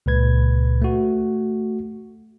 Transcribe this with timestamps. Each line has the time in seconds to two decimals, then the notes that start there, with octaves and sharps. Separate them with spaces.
0.06 C#2 A#2 B4 G#6
0.82 A3 F#4